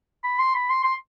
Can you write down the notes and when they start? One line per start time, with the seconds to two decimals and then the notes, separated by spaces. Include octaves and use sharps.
0.24 B5
0.39 C6
0.55 B5
0.70 C6
0.84 C6